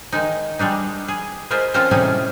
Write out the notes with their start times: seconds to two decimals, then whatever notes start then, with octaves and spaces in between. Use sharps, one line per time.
0.12 D#3 G#3 D#4
0.59 G3 G#3 D4 D#4
1.08 G#4
1.50 G#3 F4 G#4 A#4 C5 E5
1.74 C4 C#4 F4 A4 A#4 C5
1.91 A2 C3 G3 C#4 D#4 G#4